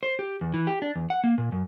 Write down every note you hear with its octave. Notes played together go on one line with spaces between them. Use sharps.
C5
G4
E2
E3
G4
D4
E2
F#5
A#3
A#2
F#2